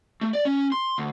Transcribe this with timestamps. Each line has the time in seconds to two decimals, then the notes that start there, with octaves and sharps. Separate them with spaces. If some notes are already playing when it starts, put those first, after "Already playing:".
0.21 A3
0.33 D5
0.45 C#4
0.72 C6
0.98 D2